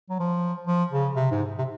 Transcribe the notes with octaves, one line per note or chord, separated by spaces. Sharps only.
F#3
F3
F3
C#3
C3
G#2
C3